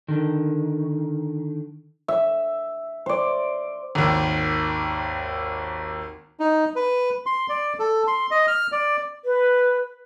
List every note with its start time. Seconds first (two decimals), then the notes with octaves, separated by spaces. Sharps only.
0.08 D3 D#3
2.08 E5
3.06 C5 D5
3.95 G#1 D#2
6.40 D#4
6.76 B4
7.26 C6
7.49 D5
7.79 A4
8.07 C6
8.31 D#5
8.48 F6
8.72 D5
9.25 B4